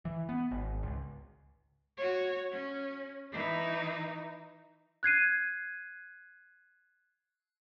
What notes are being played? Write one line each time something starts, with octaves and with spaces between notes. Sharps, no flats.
E3
B3
G#1
C#2
F#4 C#5
C#4
E3 D#4
F#6 G#6 C7 D#7